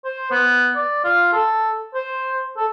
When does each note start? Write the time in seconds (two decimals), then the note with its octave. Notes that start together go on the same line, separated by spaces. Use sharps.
0.05 C5
0.31 B3
0.76 D5
1.04 F4
1.33 A4
1.94 C5
2.57 A4